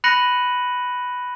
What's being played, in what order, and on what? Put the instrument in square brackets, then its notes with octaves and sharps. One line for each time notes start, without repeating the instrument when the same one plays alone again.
[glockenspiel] B5 F#6 A#6 C#7 D#7 F#7